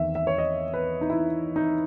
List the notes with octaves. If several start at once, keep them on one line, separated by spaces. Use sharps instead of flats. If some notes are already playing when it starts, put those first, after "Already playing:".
Already playing: E2 D#3 E5
E5
C#5
D#5
B4
D#4
E4
D#4